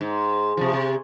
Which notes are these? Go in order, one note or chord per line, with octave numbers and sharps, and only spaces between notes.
G#2
C3 F3
C3